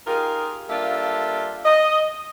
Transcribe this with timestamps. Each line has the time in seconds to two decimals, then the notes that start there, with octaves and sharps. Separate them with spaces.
0.07 D#4 F4 G4 G#4 A#4
0.70 G3 A#3 D4 F4 A4 E5
1.65 D#5